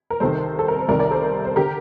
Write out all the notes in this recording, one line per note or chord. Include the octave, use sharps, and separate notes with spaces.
A#4
C2 C3 D#3 A4 C5
A4
A#4
C5
C2 C3 D#3 A#4 D5
A#4 D5
A4 C5
C5
D3 G4 A#4